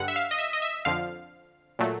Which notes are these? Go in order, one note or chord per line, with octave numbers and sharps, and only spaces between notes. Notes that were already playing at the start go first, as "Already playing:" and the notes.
Already playing: G2 D3 G3 F#5
E5
F5
D#5
E5
D#5
E5
F2 D3 F3 F5
A#2 F#3 A3